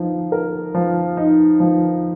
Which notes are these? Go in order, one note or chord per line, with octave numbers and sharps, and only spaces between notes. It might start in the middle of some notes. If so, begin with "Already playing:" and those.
Already playing: F3 D#4
A#4
F3
D#4
F3